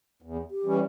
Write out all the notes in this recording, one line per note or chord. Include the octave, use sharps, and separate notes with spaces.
E2
G4
E3 G3 C#4